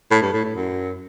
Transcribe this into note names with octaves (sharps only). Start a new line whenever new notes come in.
A2
G2
A2
A2
F#2